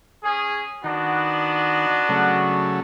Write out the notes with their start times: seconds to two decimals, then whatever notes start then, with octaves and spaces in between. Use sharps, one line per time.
0.24 C#4 G#4
0.84 D#3 B3 D4 F#4
2.09 C#3 F#3 A3